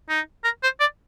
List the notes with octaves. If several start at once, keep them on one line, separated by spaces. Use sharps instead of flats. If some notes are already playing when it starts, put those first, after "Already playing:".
D#4
A#4
C5
D5